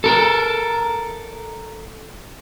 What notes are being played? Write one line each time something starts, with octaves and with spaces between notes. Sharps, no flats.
A4 A#4